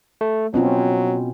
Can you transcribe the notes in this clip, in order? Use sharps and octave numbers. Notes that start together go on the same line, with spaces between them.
A3
B2 F#3 C4 C#4 F4